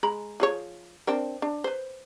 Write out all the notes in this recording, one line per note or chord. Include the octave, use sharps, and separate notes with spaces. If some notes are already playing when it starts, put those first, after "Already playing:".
G#3 A#5 B5
F3 G#4 C#5
C4 D4 A#4
D4
B4 C5